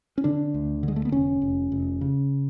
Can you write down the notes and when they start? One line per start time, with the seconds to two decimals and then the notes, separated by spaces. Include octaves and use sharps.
0.18 C#4
0.24 D3 D4
0.54 D2
0.83 D3
0.88 G#3
0.96 A3
1.05 B3
1.12 F1 C#4
1.41 F1
1.72 F1
2.01 C#3